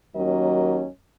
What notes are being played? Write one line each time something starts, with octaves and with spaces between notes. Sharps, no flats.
D#2 F#3 C#4 A#4 D#5